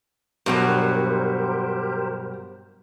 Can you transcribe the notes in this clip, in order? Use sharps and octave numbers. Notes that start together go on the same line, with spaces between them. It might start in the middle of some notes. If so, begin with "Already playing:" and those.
G2 B2 F#3 G4 A#4 C5